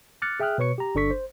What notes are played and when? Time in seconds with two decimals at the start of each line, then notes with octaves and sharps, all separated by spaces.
0.22 D6 F6 F#6 A6 C#7
0.40 G#4 E5 G5 D#6 F6 F#6
0.58 B2 B4 C#5 C#6 C#7
0.78 G4 A#5
0.95 G1 D4 A4 C#6 B6
1.11 C5